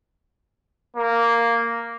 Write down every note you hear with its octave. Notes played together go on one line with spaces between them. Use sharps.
A#3